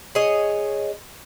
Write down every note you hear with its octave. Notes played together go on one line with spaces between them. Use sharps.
G#4 C#5 D#5